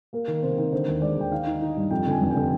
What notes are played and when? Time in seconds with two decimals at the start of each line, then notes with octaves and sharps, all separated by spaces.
0.13 A#3 A#4
0.28 D#3
0.42 C3 C5
0.58 D#3
0.72 D3 C5
0.87 D#2
1.02 G#3 D5
1.17 D#2 G5
1.32 D#4 F5
1.46 D#4
1.61 D#4
1.76 G2
1.91 F2 G5
2.06 D3 G#5
2.21 F1
2.30 G5
2.36 D3